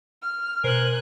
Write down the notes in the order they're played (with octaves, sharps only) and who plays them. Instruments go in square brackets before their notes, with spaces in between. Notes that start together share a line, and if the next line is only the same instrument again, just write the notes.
[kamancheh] F6
[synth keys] B2 C5 [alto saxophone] A#4 [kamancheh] G#5 F#6